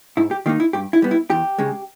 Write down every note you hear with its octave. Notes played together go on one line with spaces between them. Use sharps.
G#2 E4
G4
D#3 A#3 D#4 G4
E4
G2 G4
E4
G3 B3
E4
E2 G4
C#3 G#3